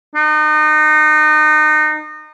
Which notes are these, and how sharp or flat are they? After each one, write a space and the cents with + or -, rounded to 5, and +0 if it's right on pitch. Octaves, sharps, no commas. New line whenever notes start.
D#4 -30